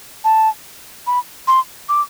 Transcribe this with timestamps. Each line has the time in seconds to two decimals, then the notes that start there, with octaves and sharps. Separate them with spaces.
0.24 A5
1.07 B5
1.48 C6
1.89 D6